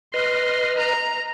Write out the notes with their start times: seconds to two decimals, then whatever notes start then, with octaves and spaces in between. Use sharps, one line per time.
0.14 B4 D#5 C6 F6
0.78 A#5